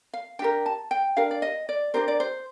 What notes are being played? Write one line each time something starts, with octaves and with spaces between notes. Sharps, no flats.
F5
D4 G4 A#4 G5
A5
G5
D4 G4 A#4 F5
D5
D#5
D5
D4 G4 A#4 C5
D5
C5